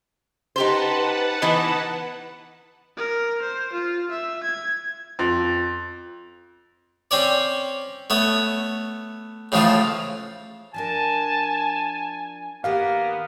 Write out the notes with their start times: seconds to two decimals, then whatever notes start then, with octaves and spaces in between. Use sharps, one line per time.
0.56 D#4 G4 B4 C5 F#5 A5
1.42 E3 B3 D#4
2.97 A#4
3.42 C5
3.72 F4
4.10 E5
4.43 G#6
5.19 F2
7.11 C4 C#4 C#5 D5
8.10 A3 B3 C#5
9.52 A2 C#3 E3 F3 A3 F4
10.74 F3 D4 A#4 G#5 A5
12.64 D#3 A#3 B3 G4 F5 F#5